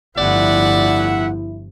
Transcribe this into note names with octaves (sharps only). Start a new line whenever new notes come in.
G1 A2 F3 E4 D5 E5 F#5